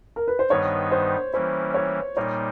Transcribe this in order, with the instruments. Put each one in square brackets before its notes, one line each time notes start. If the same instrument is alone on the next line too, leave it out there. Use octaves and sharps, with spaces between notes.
[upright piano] A#4
B4
C5
[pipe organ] G2 D#3 G3 B3 D#4 [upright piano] C#5
[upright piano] C5
[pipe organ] E3 G3 A#3 C#4 E4 [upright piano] C5
[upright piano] C#5
[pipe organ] A#2 G3 A#3 D#4 [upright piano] C#5